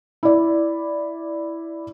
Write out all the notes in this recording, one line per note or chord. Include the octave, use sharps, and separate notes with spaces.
E4 D5